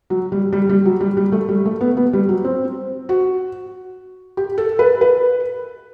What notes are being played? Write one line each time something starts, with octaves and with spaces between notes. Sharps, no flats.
F#3
G3
G3
G3
F#3
G3
G3
A3
G3
A3
B3
B3
G3
F#3
C4
F#4
G4
A4
B4
B4